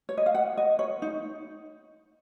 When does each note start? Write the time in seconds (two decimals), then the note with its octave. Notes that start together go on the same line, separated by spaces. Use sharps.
0.09 C#5
0.17 D#5
0.26 F5
0.34 F#5
0.57 D#5
0.79 C#5
1.02 D#4